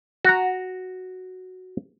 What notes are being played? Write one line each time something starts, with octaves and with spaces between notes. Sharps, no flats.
F#4 A#5